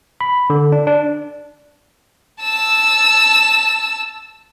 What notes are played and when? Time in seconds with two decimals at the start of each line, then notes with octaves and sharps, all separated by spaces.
0.21 B5
0.50 D3
0.72 D4
0.87 D4
2.42 A5 E6